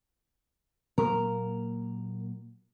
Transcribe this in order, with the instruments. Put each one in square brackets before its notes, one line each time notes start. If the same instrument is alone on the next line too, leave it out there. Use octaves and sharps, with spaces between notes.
[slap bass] A#2 F#3 A#3 [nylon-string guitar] A#4